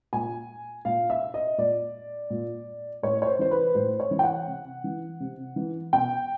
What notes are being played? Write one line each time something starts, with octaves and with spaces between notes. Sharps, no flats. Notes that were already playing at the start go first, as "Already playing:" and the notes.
A#2 G#5
A#2 F5
E5
D#5
A#2 D5
A#2
A2 C#5
C#5
C5
E3 C5
B4
A2 C5
C#5
E3
G5
F#5
C3
E3
C3
E3
B2 G5